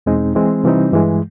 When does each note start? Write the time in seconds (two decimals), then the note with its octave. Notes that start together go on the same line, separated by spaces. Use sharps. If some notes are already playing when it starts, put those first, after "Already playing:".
0.06 E2 B2 G#3 C4 D#4
0.35 E3 G#3 C4
0.64 C3 E3 G3 C4 D#4
0.92 G2 E3 G#3